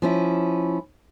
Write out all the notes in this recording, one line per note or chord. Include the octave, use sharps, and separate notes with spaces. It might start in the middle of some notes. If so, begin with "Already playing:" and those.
F3 C#4 E4